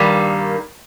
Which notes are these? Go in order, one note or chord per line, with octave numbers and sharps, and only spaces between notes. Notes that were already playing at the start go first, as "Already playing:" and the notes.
Already playing: G2 D#3 G3 A#3